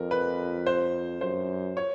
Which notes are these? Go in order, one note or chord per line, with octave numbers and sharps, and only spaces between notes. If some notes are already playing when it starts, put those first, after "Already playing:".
Already playing: F2 A#4
B4
C5
F#2 C5
C#5